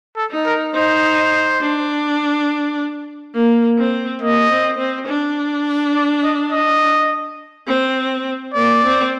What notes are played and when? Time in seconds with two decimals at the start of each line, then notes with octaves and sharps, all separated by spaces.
0.16 A4
0.31 D#4
0.45 A#4
0.74 D#4 C5
1.61 D4
3.34 A#3
3.78 C4
4.20 A#3 D#5
4.49 C4
4.78 C4
5.07 D4
5.94 D5
6.24 D#5
6.52 D#5
7.67 C4
8.54 A#3 D5
8.83 C4